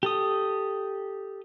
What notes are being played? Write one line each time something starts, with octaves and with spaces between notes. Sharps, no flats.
G4 A4 D#6